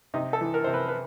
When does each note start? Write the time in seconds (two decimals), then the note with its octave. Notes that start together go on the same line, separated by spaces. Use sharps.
0.14 C3 D#4
0.33 A4
0.41 E3
0.54 A#4
0.64 C3 C5
0.74 B4
0.88 B4